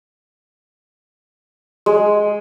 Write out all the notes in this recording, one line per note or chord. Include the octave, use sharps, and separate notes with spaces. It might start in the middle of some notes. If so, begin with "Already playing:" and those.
G#3